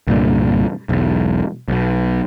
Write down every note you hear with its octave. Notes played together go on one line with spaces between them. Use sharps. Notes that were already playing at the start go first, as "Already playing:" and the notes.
C2 G2 A#2 D3
E1 B1
B1 B2